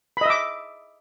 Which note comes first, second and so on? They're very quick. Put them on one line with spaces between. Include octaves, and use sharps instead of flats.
B5 D#5 E5 D6